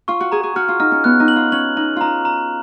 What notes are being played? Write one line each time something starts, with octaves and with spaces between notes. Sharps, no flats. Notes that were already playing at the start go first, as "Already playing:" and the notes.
F4 C#6
F#4
G#4 A#5
G#4
F#4 F6
F4
D#4 F6
C#4
B3 F#6
D#4
F#7
F4
C#4 F#7
D#4 F#7
D#4 F4 A#5
A#5